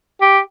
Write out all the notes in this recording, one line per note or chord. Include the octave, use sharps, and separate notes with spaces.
G4